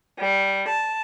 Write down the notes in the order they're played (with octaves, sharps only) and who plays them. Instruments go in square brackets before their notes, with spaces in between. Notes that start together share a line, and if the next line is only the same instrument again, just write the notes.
[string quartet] G3
A5